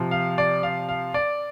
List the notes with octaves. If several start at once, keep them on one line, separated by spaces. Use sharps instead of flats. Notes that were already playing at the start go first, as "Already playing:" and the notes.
Already playing: C3 F3
F5
D5
F5
F5
D5